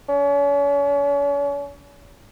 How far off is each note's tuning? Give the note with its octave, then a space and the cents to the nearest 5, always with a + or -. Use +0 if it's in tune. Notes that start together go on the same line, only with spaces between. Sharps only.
C#4 +40